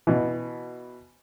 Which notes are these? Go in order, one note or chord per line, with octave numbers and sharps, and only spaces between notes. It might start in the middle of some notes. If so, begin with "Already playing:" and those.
B2 E3